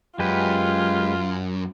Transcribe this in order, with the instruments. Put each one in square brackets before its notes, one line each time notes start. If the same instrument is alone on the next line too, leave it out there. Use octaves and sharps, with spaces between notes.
[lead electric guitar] F#2 [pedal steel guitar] G#3 G4 B4 [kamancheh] F4